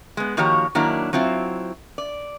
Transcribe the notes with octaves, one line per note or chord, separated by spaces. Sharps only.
G#3 B3
D#3 F3 A#3 F#4 G4 C#5
D#3 F#3 A#3 D4 E4
F#3 C4 E4 F4
D5